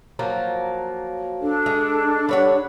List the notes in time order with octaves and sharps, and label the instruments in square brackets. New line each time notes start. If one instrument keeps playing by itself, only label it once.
[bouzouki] F3 F#3 A#3
[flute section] D4 A4
[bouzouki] G#3
G3 C#5 F#5